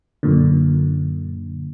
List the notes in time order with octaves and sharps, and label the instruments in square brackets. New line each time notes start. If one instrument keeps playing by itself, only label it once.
[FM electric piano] F#2 A#2 D3